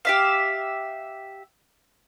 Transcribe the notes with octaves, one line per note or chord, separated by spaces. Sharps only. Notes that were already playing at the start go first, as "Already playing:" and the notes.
G4 E5 F5